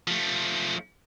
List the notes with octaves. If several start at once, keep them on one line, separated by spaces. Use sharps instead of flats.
F3 A3